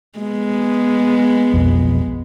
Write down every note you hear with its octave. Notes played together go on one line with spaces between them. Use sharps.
G#3 B3
F1 B1 F2